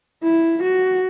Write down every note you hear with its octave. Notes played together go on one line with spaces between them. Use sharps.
E4
F#4